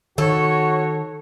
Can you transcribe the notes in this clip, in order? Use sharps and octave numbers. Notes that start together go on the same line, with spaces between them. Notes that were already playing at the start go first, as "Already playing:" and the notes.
D#3 F#4 A4 C#5